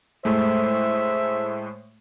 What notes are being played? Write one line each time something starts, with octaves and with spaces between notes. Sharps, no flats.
A2 G#3 A3 C5 E5